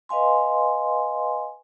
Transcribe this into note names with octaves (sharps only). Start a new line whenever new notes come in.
B4 D#5 F5 G#5 C6